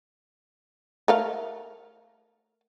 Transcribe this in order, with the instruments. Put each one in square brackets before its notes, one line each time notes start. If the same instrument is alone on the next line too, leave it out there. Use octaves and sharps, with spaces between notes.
[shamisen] A3 A#4 F5